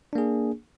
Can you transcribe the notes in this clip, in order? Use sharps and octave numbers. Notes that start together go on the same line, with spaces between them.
A#3 D4 G#4